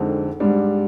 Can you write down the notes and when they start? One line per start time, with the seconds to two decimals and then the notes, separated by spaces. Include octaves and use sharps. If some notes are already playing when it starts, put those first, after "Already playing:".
Already playing: F2 D3 G#3 C4 D#4
0.40 G#2 G3 D4